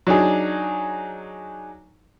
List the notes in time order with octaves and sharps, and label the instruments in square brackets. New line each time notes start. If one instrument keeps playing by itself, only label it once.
[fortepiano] F#3 D4 D#4 G#4